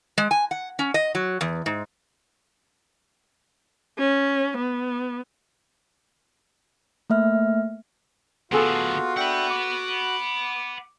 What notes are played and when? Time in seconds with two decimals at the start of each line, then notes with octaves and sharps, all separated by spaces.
0.18 G#3
0.31 G#5
0.51 F#5
0.79 C#4
0.94 D#5
1.15 F#3
1.41 E2
1.66 G#2
3.98 C#4
4.57 B3
7.10 A3 A#3 E5 F6
8.52 A2 D3 B3 F4 F#4 G#4 A4 C6
9.17 D4 E5 F#5 G5 B5
9.50 D6